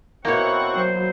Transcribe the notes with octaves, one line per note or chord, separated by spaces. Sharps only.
B2 A#3 C4 E4 C#5 F#5 G5 C#6
F#3 C5